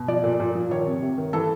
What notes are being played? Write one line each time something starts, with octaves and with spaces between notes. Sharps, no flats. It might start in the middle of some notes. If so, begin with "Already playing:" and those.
Already playing: B2
F3 D5
A#2
A#2
F3
D#3 C#5
C3
C3
D#3
E3 A4